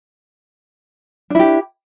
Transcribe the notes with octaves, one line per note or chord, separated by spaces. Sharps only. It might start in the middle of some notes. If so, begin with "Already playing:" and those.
D4 E4 G4